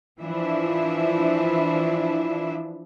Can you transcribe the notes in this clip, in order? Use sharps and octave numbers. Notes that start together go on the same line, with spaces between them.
E3 F3 D4 E4 E5